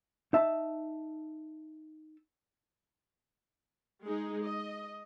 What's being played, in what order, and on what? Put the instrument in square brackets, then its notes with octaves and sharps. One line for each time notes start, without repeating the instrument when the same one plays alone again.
[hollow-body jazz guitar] D#4 E5 A5
[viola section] G#3 D#4 G#4
D#5